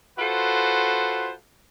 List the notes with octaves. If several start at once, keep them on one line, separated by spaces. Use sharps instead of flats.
F4 F#4 A4 B4 C5